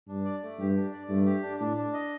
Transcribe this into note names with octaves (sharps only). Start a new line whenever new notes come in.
G2 D4
D5
A3
G2 G4
D4
D5
G2 A3
G4
D4
A2 D4
D4
D#5